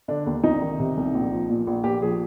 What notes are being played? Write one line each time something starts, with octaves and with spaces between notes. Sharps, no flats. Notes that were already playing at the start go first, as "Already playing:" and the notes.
D3 D4
D#2
C2 D#4
D#3
C3
C2
A#1
F3
A#2
A#1
A#1 G4
F3 G#4